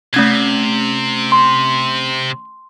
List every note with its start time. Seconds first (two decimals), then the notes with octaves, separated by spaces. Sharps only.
0.14 C3 A3 C#4 G#6
1.32 C6